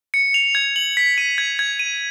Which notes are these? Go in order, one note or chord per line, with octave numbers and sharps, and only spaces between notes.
C#7
F7
G#6
F#7
B6
D#7
G#6
G#6
D#7